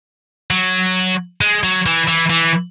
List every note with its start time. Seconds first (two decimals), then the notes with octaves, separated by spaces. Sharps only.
0.51 F#3
1.41 G#3
1.63 F#3
1.86 E3
2.08 E3
2.30 E3